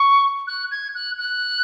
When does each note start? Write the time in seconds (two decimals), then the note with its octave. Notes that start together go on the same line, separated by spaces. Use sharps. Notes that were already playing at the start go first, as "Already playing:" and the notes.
Already playing: C#6
0.47 F#6
0.71 G#6
0.94 F#6
1.18 F#6